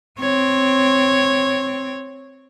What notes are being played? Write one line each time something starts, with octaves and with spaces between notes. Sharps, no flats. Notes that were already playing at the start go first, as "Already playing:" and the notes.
C4 C#5